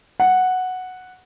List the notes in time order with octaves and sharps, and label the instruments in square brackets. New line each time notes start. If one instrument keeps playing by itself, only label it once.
[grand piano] F#5